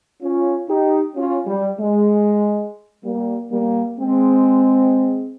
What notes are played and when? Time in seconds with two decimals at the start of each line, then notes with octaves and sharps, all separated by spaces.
0.22 C#4 F4
0.69 D#4 G4
1.16 C#4 F4
1.47 G3
1.79 G#3
3.05 G3 A#3
3.52 G3 A#3
3.99 G#3 C4